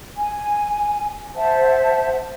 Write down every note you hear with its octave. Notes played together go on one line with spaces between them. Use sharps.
G#5
C5 E5 F#5 A5